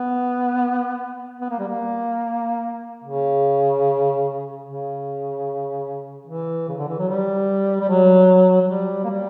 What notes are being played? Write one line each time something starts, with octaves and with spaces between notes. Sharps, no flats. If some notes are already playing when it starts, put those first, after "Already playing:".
Already playing: B3
B3
A#3
G3
A#3
C#3
C#3
E3
C#3
D3
E3
F#3
G3
G3
F#3
F#3
G3
A#3
G3